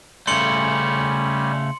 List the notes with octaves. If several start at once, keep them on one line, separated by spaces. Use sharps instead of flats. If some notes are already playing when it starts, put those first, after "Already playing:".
C#3 G3 A3 C#4 C6 C#7 F#7